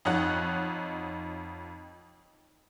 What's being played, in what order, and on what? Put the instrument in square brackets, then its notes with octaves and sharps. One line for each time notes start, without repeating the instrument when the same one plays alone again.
[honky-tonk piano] F2 D#4 C#5 F#5